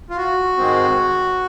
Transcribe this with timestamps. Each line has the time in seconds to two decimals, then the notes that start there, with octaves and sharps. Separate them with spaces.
0.10 F4
0.17 F#4
0.58 G#2 D#3 G#3 C4